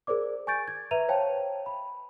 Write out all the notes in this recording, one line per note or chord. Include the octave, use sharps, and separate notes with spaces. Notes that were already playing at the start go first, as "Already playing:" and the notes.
G#4 A#4 C5 D5 D6
G#5 C#6 G6 A6 D7
G#6
B4 E5 A#5 D#7 F7
C5 C#5 F5 G5 A5
B5